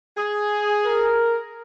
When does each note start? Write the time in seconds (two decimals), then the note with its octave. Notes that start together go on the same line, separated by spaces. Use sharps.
0.17 G#4
0.86 A#4